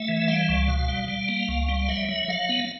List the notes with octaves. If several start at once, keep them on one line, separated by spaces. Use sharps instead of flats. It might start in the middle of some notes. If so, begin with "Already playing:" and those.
Already playing: A3 E5
E3
G3 F5
C#2
B2
G3
G3
A#3
C#2
G3
F#3 E5
F#3
F#3 F5
B3